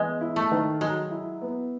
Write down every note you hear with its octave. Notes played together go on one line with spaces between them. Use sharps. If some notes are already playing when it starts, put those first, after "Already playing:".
Already playing: E3 G#3 B3
E4
A3
D#3
F#3 G#3
E4
B3